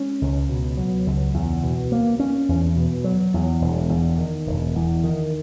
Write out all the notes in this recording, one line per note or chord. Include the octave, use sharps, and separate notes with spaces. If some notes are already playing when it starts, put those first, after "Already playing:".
Already playing: G#3 C#4
C#2
B2
F#3
C#2
E2
B2
A#3
C#4
E2
B2
F#3
E2
E1
E2
D#3
E1
E2
D#3